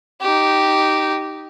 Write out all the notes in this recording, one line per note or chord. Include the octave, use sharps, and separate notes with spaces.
D#4 G4